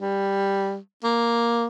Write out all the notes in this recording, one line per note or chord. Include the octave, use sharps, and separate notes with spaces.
G3
A#3